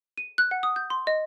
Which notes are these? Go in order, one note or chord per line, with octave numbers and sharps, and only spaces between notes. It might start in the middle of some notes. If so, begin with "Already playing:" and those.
D#7
F#6
F#5
D#6
G6
C6
D#5